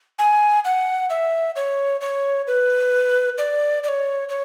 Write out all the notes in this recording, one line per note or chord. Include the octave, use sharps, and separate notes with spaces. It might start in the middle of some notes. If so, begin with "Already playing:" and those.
G#5
F#5
E5
C#5
C#5
B4
D5
D5
C#5
C#5